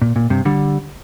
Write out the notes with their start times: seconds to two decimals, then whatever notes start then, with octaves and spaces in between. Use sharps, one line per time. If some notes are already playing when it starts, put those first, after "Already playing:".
0.02 A#2
0.16 A#2
0.30 G2 C3
0.45 D3 G3